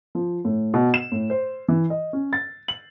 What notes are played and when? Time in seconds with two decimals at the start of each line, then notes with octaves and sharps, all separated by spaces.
0.15 F3
0.45 A2
0.74 B2
0.94 E7
1.12 A2
1.30 C5
1.68 E3
1.90 D#5
2.13 C#4
2.33 A6
2.68 F#7